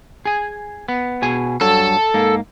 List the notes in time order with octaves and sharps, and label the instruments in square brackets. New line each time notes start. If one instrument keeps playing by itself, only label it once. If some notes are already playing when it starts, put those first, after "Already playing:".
[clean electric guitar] G#4 G#5
B3
B2 G#4 G#5
[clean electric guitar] G2 F#3 [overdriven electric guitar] A4
[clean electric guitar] G#2 A#3